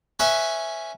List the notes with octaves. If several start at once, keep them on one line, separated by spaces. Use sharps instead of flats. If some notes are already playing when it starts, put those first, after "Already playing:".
C#4 B4 E5 G#5